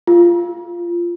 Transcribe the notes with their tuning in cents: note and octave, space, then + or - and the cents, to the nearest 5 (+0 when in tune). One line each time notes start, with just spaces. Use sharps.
F4 -10